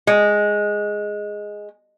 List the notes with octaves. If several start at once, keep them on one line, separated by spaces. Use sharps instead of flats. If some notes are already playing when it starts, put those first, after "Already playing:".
G#3